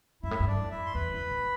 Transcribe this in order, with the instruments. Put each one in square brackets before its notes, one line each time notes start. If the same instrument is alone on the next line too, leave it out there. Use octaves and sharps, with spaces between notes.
[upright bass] G2 [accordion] E4 E5
[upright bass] A2
G2
[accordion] D4 D5
[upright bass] F2
[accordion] E4 E5
C6
[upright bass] E2 [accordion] B4 B5
[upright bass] F2
A2